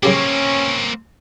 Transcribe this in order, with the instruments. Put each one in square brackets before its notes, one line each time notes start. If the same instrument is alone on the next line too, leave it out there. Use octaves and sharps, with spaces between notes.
[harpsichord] F#2 C#3 G4 [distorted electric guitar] A#3 C4 [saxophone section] C#4